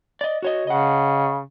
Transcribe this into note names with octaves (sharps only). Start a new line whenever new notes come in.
D5 D#5
F#4 C#5 D#5
C#3 D#5 F#5